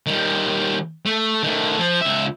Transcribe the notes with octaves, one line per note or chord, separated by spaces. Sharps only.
D#3 G3
A3
D#3 A3
F3
C#2 E5